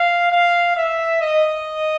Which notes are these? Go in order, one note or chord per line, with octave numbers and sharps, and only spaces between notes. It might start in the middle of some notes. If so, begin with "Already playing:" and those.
Already playing: F5
F5
E5
D#5